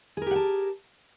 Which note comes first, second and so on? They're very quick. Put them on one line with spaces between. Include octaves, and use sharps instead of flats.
G#4 A#4 G4 F#5 A5